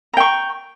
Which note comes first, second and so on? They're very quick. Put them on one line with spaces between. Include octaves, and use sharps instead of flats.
A#5 G5 C#6